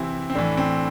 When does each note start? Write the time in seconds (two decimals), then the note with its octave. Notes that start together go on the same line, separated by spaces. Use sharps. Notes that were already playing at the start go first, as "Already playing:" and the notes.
Already playing: C3 E3 C4 E4
0.30 C4
0.35 A2 E3 D4
0.57 C4